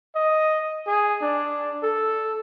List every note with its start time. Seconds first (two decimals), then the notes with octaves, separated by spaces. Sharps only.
0.15 D#5
0.87 G#4
1.22 D4
1.83 A4